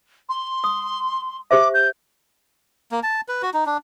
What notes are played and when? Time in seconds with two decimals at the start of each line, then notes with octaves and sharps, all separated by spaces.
0.29 C6
0.64 D#6
1.51 G4 C5 E5 D6
1.74 G6
2.92 A#3
3.03 A5
3.29 B4
3.42 F#4
3.54 D#4
3.66 D4